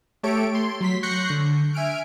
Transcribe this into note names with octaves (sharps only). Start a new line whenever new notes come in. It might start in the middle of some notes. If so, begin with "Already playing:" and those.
A3 G4 A4 C#5 D7
C6
F#3 C6 B6
C#6 F#6 G6 A#6 C7 C#7
D3
E5 G#5 F6 D7